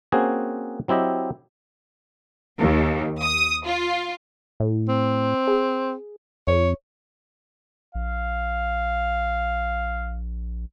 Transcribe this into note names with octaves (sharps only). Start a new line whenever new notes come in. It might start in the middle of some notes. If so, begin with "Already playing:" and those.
A#3 C4 C#4 F#4 G#4 C5
F#3 C4 E4 G4 D#5
D#2
D#6
F4
A2
C4
G#4
F2 C#5
A#1 F5